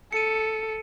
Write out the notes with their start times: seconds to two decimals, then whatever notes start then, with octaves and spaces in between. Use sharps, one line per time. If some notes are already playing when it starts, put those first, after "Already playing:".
0.13 A4 C#7 D#7